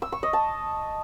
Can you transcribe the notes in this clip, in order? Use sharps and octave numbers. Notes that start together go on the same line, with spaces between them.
E6
C#6
D#5
A5